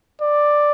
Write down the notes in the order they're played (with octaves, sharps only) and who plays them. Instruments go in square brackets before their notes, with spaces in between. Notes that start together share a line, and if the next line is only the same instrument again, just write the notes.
[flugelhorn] D5